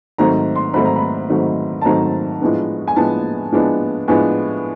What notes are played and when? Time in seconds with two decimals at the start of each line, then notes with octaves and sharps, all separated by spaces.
0.18 G#2 D#3 F#3 A3 C4 A#5
0.56 C6
0.74 G#2 D#3 F#3 A3 C4 B5
0.85 A#5
0.96 B5
1.30 G#2 D#3 F#3 A3 C4
1.82 A5
1.85 G#2 D#3 F#3 A3 C4 A#5
2.41 A2 F3 G#3 B3 D4
2.88 G#5
2.96 A2 F3 G#3 B3 D4 A5
3.52 A2 F3 G#3 B3 D4
4.08 A2 F3 G#3 B3 D4 G#5